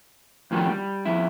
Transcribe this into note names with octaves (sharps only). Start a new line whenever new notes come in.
F2 A2 D#3 F3 G4
G3
F2 E4